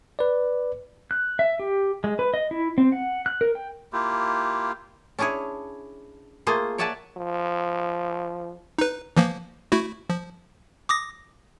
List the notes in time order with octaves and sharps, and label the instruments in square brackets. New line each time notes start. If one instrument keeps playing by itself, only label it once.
[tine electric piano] B4 D5
[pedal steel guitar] F#6
E5
G4
G#3
B4
D#5
E4
C4
F#5
F#6
A#4
G5
[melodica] A#3 E4 F4 G4
[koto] C#4 D4 E4 G#4 C#5
A3 A#3 F4 G#4 C5
C#5 D5 E5 F#5 G#5 A5
[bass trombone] F3
[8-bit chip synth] D#4 B4
E3 F3 A#3
A3 E4 F#4
F3
D6 D#6 A#6